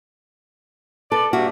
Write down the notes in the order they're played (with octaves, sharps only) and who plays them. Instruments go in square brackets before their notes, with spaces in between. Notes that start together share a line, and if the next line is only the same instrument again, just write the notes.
[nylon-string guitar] A4 [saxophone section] B4 D5
[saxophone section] G2 A#3 E5 [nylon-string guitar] F#4